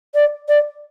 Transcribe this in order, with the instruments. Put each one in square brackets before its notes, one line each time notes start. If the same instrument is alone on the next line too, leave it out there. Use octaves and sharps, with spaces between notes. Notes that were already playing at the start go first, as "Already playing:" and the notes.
[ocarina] D5
D5